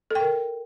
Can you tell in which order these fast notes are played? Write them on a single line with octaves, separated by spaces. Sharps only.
A4 G5 A#4